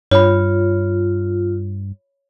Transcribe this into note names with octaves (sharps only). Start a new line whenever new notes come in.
G2 F4 C#5 B5